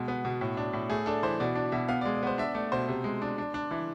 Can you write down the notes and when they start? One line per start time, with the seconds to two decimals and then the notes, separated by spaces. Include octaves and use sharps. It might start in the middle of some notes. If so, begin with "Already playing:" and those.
Already playing: B2 G#3
0.08 B3
0.25 B2
0.41 A2
0.57 D4
0.73 A2
0.89 A3 G#4
1.06 D4 A4
1.23 E3 C5
1.40 B2 D5
1.55 D4
1.72 B2 E5
1.88 B3 F5
2.01 D5
2.05 G#3
2.14 D5
2.23 B3 C5
2.38 D4 E5
2.55 A3 D5
2.72 B2 C5
2.88 C3
3.04 G#3
3.22 D4
3.38 D4
3.54 D4
3.71 E3